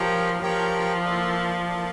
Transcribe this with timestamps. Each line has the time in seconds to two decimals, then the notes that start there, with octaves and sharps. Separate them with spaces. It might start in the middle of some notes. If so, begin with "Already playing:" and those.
Already playing: F3 G4 A#4 C#5 G5
0.42 F3 G4 A#4 C#5 G5
1.05 A#3 E4 A4 D5 A5
1.68 A#3 E4 A4 D5 A5